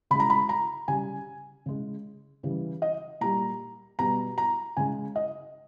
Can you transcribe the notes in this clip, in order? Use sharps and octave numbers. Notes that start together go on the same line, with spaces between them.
C#3 G#3 B5
A#5
B5
A#5
C#3 G3 G#5
C#3 G#3
C#3 E3 G3
D#5
A#2 G3 A#5
B2 G3 A#5
A#5
C#3 G#3 G#5
D#5